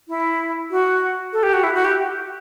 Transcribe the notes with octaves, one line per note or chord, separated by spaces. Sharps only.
E4
F#4
A4
G4
F#4
E4
F#4
G4